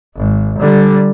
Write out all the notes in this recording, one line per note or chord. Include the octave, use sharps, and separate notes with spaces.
G#1
D3 G3